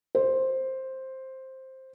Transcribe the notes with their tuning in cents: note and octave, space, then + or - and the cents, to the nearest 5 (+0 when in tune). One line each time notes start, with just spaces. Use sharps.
C5 +5